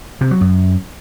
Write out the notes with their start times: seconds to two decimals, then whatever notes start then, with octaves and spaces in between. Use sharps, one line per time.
0.21 C3
0.31 F#3
0.41 F#2